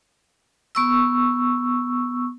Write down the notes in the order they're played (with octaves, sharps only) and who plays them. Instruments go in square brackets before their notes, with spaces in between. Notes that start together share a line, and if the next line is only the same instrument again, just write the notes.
[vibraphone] B3 C#6 E6